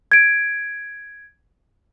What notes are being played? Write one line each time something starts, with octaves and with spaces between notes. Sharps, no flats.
G#6 D7